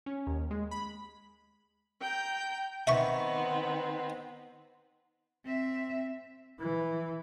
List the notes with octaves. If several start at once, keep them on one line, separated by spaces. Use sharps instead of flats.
C#4
D#2
G#3
B5
G5 A#5 G6
D#3 B3 C4 E5 B5 C#6
C4 E5
E3